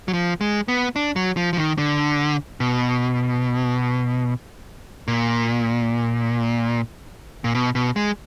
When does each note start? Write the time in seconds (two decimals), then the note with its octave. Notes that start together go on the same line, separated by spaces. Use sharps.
0.08 F#3
0.13 F3
0.41 G#3
0.68 B3
0.96 D4
1.16 F#3
1.37 F3
1.53 F3
1.57 D#3
1.78 D3
2.60 B2
5.08 A#2
7.44 A#2
7.55 B2
7.75 B2
7.96 G#3